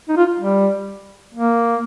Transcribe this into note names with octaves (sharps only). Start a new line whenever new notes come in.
D#4
F4
G3
A#3